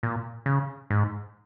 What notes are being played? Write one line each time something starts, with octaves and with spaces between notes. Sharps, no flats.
A#2
C#3
G#2